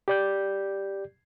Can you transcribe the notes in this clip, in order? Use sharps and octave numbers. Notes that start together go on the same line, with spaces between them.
G4 D5 G6